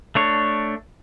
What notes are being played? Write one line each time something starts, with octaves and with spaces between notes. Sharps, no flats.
A3 D4 C#5